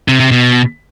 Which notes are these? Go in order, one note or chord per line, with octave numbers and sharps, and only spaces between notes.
C3
C3
B2